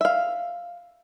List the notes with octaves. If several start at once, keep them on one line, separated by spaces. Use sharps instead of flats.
E5 F5